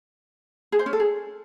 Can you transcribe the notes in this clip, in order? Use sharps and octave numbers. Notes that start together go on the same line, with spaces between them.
G#4
C5
C#4
A4
G#4